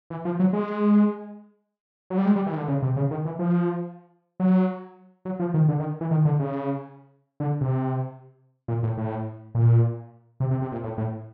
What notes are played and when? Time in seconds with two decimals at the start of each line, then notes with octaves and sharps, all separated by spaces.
0.10 E3
0.25 F3
0.39 F#3
0.53 G#3
2.10 F#3
2.18 G3
2.26 G#3
2.36 G3
2.46 E3
2.52 D#3
2.57 D3
2.68 C#3
2.82 C3
2.96 C#3
3.11 D#3
3.25 E3
3.39 F3
4.40 F#3
5.25 F#3
5.39 F3
5.54 D#3
5.68 D3
5.80 D#3
6.01 E3
6.11 D#3
6.25 D3
6.39 C#3
7.40 D3
7.61 C3
8.68 A#2
8.83 A2
8.98 A2
9.55 A#2
10.40 C3
10.51 C3
10.62 C3
10.72 A#2
10.84 A2
10.98 A2